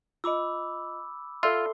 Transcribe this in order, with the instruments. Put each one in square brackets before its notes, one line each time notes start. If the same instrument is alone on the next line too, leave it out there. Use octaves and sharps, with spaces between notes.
[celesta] F4 D#5 [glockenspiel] B5 D6 E6
[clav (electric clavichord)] F4 [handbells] A4 C6 [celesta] D5 E5 E6